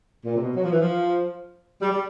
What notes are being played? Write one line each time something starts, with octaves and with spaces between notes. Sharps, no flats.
A#2
C3
B2
F#3
F3
E3
F3
G3
G3